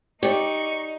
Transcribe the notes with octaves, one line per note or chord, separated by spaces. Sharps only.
D#4 G4 D5 C#6